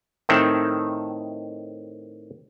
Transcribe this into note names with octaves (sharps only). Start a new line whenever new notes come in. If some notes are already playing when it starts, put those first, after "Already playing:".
A2 D#3 C4 A4 E5